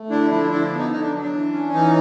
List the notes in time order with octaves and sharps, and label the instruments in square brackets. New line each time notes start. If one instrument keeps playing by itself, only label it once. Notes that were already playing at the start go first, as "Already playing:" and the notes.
Already playing: [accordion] A3
D3 D4 E4
F3 D4 E4
D3 D4 E4
D4
B3
D#4
D3 D#4
D4
F#3
D4
E3
C#4
E3 D#4